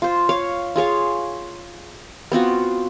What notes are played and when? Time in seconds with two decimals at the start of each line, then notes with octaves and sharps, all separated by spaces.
0.02 F4 C5
0.29 C#5 F5
0.76 F4 G#4 C#5 F5
2.32 B3 C4 F4 F#4